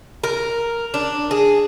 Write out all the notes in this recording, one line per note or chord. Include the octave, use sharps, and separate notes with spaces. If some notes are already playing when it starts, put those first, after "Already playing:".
A#4
D4
G#4